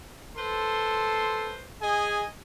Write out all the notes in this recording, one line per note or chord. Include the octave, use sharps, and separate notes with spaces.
A4 B4 C5 C6
G#4 D#5 G#5